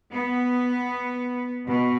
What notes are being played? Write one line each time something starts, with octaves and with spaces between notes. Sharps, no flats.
B3
B2